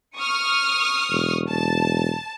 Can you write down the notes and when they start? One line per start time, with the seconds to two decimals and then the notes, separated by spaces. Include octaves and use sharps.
0.18 C#6 D#6 F6
1.11 E1
1.50 E1 A5